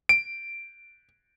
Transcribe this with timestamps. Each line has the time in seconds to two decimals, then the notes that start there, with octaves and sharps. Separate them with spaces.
0.09 D7